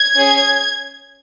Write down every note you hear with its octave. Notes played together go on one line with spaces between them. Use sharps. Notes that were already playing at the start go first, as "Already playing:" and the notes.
Already playing: G#6
C#4 G#4